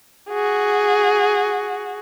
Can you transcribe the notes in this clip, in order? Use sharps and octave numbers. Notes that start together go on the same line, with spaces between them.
F#4 G#4